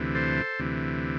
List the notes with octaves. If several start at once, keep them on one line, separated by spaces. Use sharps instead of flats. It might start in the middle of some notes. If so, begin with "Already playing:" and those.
Already playing: D2 C3 E3
A4 C5
D2 C3 E3